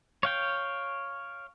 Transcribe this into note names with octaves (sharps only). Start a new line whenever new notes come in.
C#5 F5 G5